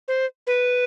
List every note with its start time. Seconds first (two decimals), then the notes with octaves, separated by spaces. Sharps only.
0.08 C5
0.47 B4